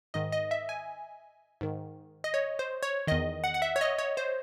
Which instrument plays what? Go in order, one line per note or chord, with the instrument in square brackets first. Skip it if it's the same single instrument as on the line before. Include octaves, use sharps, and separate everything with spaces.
[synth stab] G#2 D#3 D#5
D#5
E5
G#5
G#2 D#3
D#5
C#5
C5
C#5
E2 D#3 D#5
F#5
F#5
E5
C#5
D#5
C#5
C5